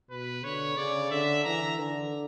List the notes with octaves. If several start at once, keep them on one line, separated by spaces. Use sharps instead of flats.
B2 B4
D3 C#5
C#3 D5
D3 E5
E3 A#5
D3